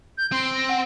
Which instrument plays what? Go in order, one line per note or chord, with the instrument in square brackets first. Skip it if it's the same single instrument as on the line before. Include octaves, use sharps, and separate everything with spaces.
[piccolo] G6
[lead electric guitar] C4 [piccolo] C6
[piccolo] A#6
[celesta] F#5